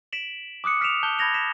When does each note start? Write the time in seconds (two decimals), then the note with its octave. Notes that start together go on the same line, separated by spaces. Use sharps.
0.13 B6 D7 E7 F#7
0.64 D6 D#6 F#6 C#7
0.81 F6 B6 C#7 D7 E7 F7
1.03 A5 F#6 G6 G7
1.19 A5 B5 G6 G#6 A#6 F7
1.34 B6 E7